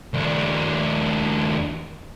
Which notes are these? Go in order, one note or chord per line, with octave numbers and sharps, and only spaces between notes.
D#2 D4